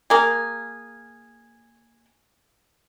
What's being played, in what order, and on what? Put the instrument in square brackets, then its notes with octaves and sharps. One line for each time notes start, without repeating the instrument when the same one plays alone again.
[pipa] A#3 G#4